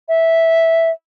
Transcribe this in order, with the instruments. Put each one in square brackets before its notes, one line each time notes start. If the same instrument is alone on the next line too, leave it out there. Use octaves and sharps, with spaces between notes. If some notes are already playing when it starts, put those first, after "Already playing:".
[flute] E5